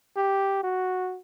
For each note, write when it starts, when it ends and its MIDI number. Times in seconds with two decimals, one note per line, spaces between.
0.17 0.62 67
0.63 1.18 66